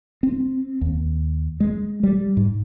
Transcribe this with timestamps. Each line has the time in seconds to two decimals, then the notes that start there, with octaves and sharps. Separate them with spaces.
0.23 C4
0.81 D#2
1.60 G#3
2.03 G3
2.37 G#2